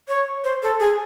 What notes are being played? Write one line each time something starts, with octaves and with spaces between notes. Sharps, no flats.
C#5
C5
A4
G#4